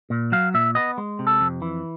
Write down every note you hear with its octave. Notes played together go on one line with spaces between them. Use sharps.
A#2
F#3 F5
A#2 E5
B3 D#5
G#3
C3
A4
F2
E3